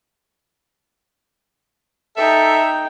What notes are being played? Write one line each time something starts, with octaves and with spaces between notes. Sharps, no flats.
D#4 A4 E5 G5